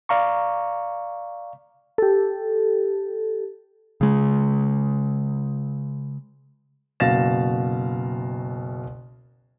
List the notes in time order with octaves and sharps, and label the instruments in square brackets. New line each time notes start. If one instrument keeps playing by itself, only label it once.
[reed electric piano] D5 F5 A#5 C#6
[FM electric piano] G4 A4
[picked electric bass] C#3 G#3
[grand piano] F#1 B2 F5 A6 A#6 E7